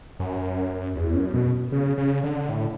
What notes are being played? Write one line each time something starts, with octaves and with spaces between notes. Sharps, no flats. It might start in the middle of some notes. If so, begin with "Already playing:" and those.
F#2
E2
F#2
B2
C#3
C#3
D3
A2